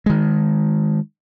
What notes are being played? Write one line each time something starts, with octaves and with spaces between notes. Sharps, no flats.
D#3 G#3